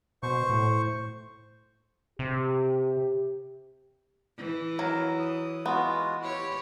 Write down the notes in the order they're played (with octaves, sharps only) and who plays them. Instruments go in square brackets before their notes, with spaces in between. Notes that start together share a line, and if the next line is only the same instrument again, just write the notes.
[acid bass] B2 [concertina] C5 C#6
[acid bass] A2
[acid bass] C3 [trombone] G4
[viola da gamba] E3
[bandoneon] F2 A#4 [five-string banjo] F#3
[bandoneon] D#6
[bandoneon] G#3 F4 F#4 [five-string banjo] B3
[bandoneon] E4 [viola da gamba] G4 C#5